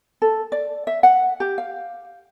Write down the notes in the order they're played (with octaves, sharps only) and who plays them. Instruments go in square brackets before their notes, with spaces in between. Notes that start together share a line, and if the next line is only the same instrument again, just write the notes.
[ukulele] A4
D5
E5
F#5
G4
F5